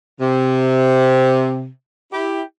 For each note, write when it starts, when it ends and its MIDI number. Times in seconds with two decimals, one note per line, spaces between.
0.20 1.68 48
2.12 2.42 64
2.12 2.42 67